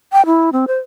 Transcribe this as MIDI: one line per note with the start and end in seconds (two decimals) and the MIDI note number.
0.13 0.25 79
0.26 0.50 64
0.53 0.65 60
0.68 0.78 72